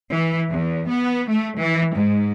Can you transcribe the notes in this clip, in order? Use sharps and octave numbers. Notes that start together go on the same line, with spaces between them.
E3
E2
B3
A3
E3
G#2